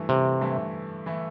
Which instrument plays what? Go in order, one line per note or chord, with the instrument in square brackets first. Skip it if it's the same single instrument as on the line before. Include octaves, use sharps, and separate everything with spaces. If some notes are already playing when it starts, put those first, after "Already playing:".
Already playing: [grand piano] G2 E3 A3 E4
[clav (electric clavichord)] C3
[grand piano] G2 E3 A3 E4
E3 A3 E4